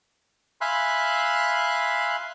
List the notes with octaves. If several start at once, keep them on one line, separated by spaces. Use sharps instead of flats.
E5 F5 G#5 B5 C6 F#6